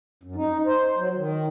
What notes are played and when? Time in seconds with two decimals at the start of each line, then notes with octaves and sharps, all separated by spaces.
0.23 F#2
0.36 D#4
0.66 C5
0.98 F#3
1.16 D#3